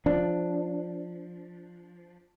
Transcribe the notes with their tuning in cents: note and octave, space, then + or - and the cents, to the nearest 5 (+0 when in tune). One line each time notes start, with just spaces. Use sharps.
F3 +0 D4 +0